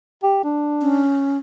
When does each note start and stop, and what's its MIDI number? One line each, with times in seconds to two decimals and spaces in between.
0.23 0.40 67
0.44 1.02 62
0.82 1.38 61